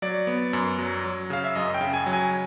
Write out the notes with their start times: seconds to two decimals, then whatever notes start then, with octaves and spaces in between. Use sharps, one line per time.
0.02 F#3 D5
0.27 B3
0.53 F#2
0.79 F#3
1.04 F#3
1.30 C#3 F5
1.44 E5
1.55 F#2 D#5
1.74 G5
1.81 C#3
1.94 G#5
2.06 F#3
2.13 G#5